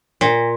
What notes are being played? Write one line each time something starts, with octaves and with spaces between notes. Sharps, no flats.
A#2